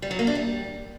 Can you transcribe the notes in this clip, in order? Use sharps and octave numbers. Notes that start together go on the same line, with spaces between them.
G3
F#3
A#3
D4
G3